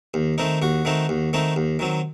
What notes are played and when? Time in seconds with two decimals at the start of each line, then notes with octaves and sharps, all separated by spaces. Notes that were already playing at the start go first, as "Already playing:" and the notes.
0.14 D#2
0.38 D#3 A3 C4 D#4
0.62 D#2 F#4
0.85 D#3 A3 C4 D#4
1.09 D#2
1.33 D#3 A3 C4 D#4
1.56 D#2
1.79 D#3 F#3 C4